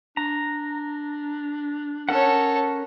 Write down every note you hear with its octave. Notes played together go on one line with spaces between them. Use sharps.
D4 A#5
C#4 A4 A#4 C#5 F#5